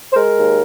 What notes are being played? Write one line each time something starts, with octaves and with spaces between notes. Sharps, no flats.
C5
G#3 A#4
D#2